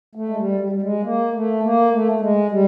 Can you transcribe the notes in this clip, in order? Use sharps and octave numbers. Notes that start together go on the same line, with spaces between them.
A3
G#3
G3
G3
G3
G#3
A#3
A3
A#3
A3
A3
G#3
G3